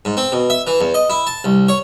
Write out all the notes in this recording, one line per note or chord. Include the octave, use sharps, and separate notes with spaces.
G#2
C4
B2
E5
E3
E2
D#5
E4
A5
C2
C#5